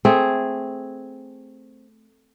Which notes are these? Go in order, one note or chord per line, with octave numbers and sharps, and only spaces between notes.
A3 C4 G#4